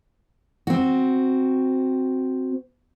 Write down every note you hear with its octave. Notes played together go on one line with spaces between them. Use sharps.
C4 F#4